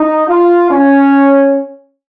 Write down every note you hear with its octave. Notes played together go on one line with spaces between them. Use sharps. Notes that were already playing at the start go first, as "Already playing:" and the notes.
Already playing: D#4
F4
C#4